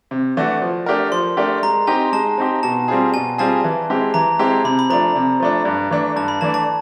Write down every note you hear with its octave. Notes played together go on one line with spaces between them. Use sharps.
C3
E3 A3 D4 F#4
F3
A3 D4 G4 A#4
F3 C6
A3 D4 G4 A#4
G#3 A#5
C4 D#4 G4 G#5
G#3 A5
C4 D#4 G4
B2 A5
G3 C4 F4 G#4
B2 G#5
G3 C4 F4 G#4 A5
E3
G#3 C4 E4 G4
E3 A#5
G#3 C4 E4 G4
C3 B5
B5
F3 A3 D4 A#5
C3
F3 A3 D4
G2
E3 A3 D4
G2 A5
B5
E3 A3 D4 A5
A5